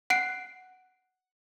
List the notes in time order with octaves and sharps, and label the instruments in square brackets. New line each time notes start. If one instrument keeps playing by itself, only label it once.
[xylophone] F#5 F#6 C7 D7